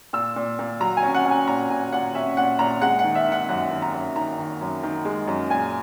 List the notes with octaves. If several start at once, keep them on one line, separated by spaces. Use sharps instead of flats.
A#2 E6
A#2
A#2
F#3 A#5
G#5
C#4
F#5
C#4 G#5
A#2 A#5
A#2 G#5
A#2 F#5
C#4 E5
A#2 F#5
A#2 A#5
G#3 F#5
F#5
D#3
E5
D#3
F#5
F#2 F#5
D#3
A#5
F#2
D#3 A#5
D#3
F#2
D#3
G#3
F#2
A#2 G#5